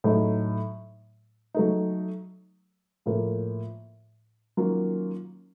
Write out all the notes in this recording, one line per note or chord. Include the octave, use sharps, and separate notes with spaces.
A2 F#3 A3 D#4
F#3 A3 D#4
A2 F3 A#3 F4 A4
D#3 F#3 A#3 C#4 F4